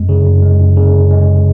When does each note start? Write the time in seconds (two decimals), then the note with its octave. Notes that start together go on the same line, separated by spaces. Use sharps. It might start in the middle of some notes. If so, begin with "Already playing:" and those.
Already playing: F#2 G#3
0.09 C#3
0.25 F#2
0.42 G#3
0.60 F#2
0.77 C#3
0.94 F#2
1.11 G#3